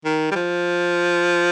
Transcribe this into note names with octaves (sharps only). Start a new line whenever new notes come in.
D#3
G3
F3